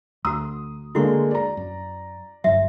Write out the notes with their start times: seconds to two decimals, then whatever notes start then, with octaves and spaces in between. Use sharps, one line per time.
0.25 D2 F#4 A#5 D#6
0.95 D3 G#3 A#3 E4 F#4 C#6
1.31 D5 A#5
1.57 F#2
2.44 G1 G2 F#3 F#4 E5